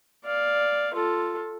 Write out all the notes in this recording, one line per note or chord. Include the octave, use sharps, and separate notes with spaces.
D5 F5
F4 A4